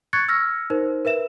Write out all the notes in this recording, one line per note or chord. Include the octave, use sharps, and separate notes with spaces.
C#6 F#6 G#6 A6 C#7
E6 F6 A#6
D#4 A#4 C5
A#4 B4 E5 E7